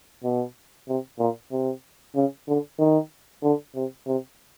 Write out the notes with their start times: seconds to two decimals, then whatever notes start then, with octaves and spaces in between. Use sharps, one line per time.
0.24 B2
0.88 C3
1.19 A#2
1.52 C3
2.15 C#3
2.48 D3
2.79 D#3
3.43 D3
3.75 C3
4.07 C3